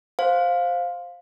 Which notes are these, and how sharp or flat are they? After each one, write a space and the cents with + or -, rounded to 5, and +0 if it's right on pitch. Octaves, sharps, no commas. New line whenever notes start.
C5 +0 F5 +10